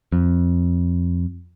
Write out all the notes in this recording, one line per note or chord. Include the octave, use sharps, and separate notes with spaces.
F2